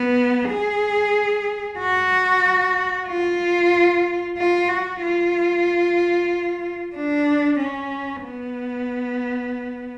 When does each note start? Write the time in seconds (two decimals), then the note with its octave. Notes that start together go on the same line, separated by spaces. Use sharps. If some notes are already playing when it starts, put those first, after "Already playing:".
Already playing: B3
0.49 G#4
1.79 F#4
3.08 F4
4.37 F4
4.69 F#4
5.02 F4
6.95 D4
7.60 C#4
8.24 B3